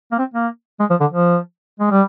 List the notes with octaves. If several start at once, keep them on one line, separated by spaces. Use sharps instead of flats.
A#3
C4
A#3
G#3
F3
D3
F3
G#3
G3